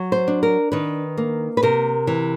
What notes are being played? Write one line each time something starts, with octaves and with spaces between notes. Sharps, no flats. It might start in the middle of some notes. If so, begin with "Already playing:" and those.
Already playing: F#3
C5
D4
A#4
D#3 B4
A#3
B4
C3 A#4
E3